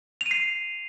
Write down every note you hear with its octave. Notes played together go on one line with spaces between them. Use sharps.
F7
D#7
C7